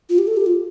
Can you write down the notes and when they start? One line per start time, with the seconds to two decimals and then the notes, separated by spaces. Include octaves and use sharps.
0.10 F4
0.18 G4
0.27 A4
0.37 G4
0.46 F4